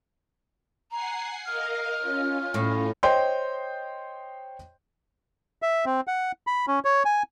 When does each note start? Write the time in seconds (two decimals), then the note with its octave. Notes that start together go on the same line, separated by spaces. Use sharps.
0.91 F#5 G#5 A#5 C7
1.45 A#4 D#5 F5 F6
2.00 C#4 F4
2.54 A2
3.03 C5 C#5 D#5 G5 C6 G6
5.62 E5
5.85 C4
6.07 F#5
6.47 B5
6.67 C#4
6.85 C#5
7.05 G#5